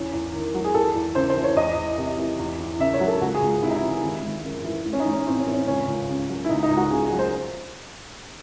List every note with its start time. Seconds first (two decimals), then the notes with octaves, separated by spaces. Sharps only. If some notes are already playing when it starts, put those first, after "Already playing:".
Already playing: E2 C#4
0.13 E2
0.34 D#3
0.54 F#3
0.64 G#4
0.74 E2 A4
0.96 E2
1.15 C#3 C5
1.30 C5
1.37 E3
1.44 C#5
1.56 E2 D#5
1.77 E2
1.98 C3
2.18 E3
2.39 E2
2.60 E2
2.79 C#3 E5
2.94 C#5
3.00 F#3
3.08 A4
3.21 C#2 F#4
3.34 G#4
3.42 C#2
3.62 C3 E4
3.69 D#4
3.76 E4
3.83 E3
4.03 G#1
4.23 G#1
4.45 F#2
4.64 E3
4.86 A1
4.93 C#4
5.00 D#4
5.05 A1
5.13 C#4
5.27 A2 C4
5.40 C#4
5.47 E3
5.53 C#4
5.67 C#2 C#4
5.87 C#2
6.09 C#3
6.29 F#3
6.44 E4
6.49 C#2 D#4
6.63 D#4
6.70 C#2
6.77 F#4
6.91 C#3 G#4
7.05 G#4
7.12 F#3
7.19 C5